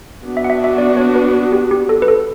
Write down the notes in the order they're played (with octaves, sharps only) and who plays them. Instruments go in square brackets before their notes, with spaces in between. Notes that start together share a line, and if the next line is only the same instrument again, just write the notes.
[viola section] B3 D4 F#4
[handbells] E5
F#5
E5
E5
D5
C#5
B4
G4
G4
A4
B4
A4